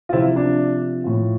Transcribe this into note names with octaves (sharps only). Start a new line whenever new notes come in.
F4
C3 F3 C4 E4
D4
A2 F3